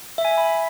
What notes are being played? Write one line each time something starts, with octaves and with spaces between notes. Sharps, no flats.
E5
G#5
E5
B5